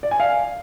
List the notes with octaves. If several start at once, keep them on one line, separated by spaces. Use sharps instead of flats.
D5
G#5
F5